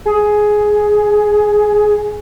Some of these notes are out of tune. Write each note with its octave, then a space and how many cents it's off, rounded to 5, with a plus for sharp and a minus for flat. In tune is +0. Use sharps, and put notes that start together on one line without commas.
G#4 +10